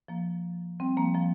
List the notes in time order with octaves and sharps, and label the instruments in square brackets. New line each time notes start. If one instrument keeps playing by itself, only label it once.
[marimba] F3 A#3
G3 C4
F3 A#3
F3 A#3